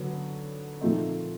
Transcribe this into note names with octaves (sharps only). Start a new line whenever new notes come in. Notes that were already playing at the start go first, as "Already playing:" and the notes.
Already playing: D3 F#3 B3
A#2 F3 A3 C4 D#4